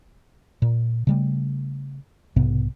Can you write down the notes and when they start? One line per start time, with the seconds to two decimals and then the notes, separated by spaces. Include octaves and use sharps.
0.62 A#2
1.07 C#3 G3 A3
2.36 B1 G#2 C3 B3